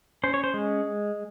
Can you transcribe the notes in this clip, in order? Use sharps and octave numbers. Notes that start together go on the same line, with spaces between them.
C#4 C5
C#5
C5
G#3